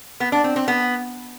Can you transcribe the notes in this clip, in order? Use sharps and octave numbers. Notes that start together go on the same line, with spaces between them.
B3
D4
C4
C4
B3